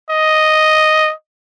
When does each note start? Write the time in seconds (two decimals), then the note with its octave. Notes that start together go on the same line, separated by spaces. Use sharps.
0.10 D#5